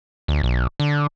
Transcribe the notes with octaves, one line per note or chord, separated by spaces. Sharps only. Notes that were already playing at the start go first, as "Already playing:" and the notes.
D2
B1
D3